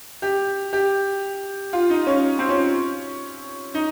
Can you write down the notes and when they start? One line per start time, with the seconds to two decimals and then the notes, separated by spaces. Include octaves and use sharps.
0.22 G4
0.73 G4
1.73 F4
1.90 D#4
2.07 C#4
2.39 C4
2.49 C#4
3.74 D#4